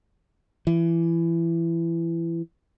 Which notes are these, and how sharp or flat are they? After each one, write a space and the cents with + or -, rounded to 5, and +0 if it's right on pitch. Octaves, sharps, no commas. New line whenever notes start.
E3 +20